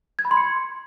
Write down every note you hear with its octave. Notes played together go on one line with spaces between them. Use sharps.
G#6
B5
C6
C#7